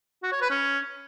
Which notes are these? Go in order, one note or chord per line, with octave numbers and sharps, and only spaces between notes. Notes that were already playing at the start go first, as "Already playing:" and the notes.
F#4
C#5
B4
C#4